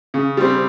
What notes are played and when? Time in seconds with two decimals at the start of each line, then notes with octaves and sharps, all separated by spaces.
0.14 C#3
0.37 G3 C4